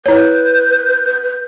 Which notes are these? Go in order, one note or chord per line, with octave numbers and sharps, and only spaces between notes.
E4 B4 C#5 G6